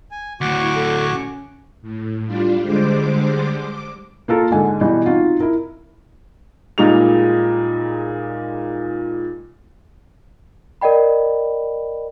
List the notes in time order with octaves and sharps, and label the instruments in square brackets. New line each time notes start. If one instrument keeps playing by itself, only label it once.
[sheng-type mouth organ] G#5
[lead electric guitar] D2 A2 [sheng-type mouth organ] F#4 C#6 D6
[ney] E4
A4
C#4
[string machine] A2
G3 D4 F4
D3 G3 G#3 C5 D6
D6
[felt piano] A#3 F4 A4 A#4
G#2 D3 G#5
B2 E3 G3
C4 D#4 F4 F#4
E4 A#4
[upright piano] A#2 G3 G#3 D#4 G#4 F7
[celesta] A#4 D5 D#5 G5 B5